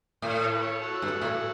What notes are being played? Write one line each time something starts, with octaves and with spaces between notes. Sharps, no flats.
A2
A4 C#5
B4
A4 C#5
F#4 A4
G2
A2